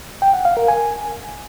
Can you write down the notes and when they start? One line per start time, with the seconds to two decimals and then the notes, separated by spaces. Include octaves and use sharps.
0.22 G5
0.34 F#5
0.45 F5
0.57 A#4
0.68 G#5